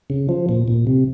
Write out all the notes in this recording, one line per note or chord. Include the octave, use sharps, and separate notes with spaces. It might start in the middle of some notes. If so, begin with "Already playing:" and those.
C#3
F3
A#2
A#2
C3